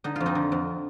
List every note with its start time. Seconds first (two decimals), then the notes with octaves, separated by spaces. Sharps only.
0.04 D3 D#4
0.16 F2 F4
0.26 C4 D#4
0.35 D3
0.52 F2